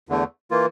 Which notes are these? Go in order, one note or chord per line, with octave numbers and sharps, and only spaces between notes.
E2 D3 A3
E3 A#3 F4